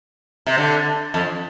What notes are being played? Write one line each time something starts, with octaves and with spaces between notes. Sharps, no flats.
C3
D3
F2